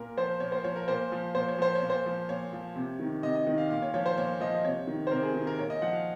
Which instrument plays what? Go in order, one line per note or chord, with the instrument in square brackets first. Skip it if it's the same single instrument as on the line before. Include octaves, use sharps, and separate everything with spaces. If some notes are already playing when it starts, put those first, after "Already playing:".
Already playing: [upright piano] A#2 A#4
F3 C5
A#2 C#5
C5
F3 C#5
A#4
A#2 C5
F3
A#2 C5
C#5
F3 C5
C#5
A#2
C5
F3
A#2 C#5
F3
C3
D#3
C3 D#5
D#5
D#3
F5
A#2 F5
C#5
F3 C#5
C5
A#2 C#5
F3 D#5
D#5
C3 C#5
D#3
C5
C3 A#4
G#4
D#3 G#4
A#4
A#2 C#5
D#5
F3 F#5
F5